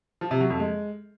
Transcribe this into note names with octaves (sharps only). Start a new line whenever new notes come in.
F3
C3
F#3
F2
G#3